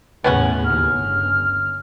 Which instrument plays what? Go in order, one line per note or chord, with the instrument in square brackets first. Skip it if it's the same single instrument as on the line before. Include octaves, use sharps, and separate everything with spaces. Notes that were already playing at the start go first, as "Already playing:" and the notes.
[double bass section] E2 A2 C#3 [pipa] B3 C#4 F#5
[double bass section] D#2 [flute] F6
[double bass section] G1